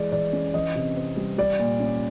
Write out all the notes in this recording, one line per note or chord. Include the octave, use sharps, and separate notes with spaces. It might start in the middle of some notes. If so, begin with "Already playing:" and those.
Already playing: E3 G#3 D5
E3 D5
C#4
E3 D#5
C3
C4
G3
G3 D5
A#2
C#4